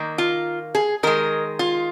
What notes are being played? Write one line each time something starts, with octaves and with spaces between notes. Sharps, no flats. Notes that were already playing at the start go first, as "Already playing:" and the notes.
Already playing: D#3 A#3
F4
G#4
D#3 G#3 A#4
F4